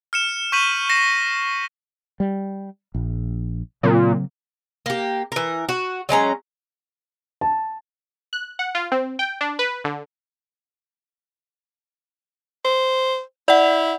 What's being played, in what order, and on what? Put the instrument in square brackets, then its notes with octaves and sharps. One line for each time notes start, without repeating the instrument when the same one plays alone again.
[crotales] F6 C#7 E7
C#6 G6 B6 D#7 F#7
A#6 C7 C#7 E7
[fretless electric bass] G3
A#1
[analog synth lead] A#2 [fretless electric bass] C#3 F#3 C4
[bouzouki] A#3 G4
E3 A#4
F#4
F#3 G#3 C#4 A#5
[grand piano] A5
[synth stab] F#6
F#5
F4
C4
G5
D4
B4
D3
[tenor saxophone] C5
[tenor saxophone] E4 [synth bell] D5 F#5